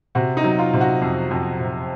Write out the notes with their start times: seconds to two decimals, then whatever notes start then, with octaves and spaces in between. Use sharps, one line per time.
0.15 C3 F#4
0.37 D#4
0.44 F#3
0.59 F4
0.74 C3
0.81 F#4
1.02 F2
1.31 F2
1.60 C3